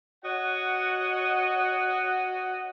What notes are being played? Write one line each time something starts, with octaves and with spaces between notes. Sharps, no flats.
F#4 C#5 D#5 F#5